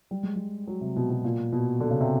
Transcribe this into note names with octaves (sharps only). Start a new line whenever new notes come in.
G3
G#3
G3
F#3
C3
B2
B2
A#2
B2
D3
C#3
C3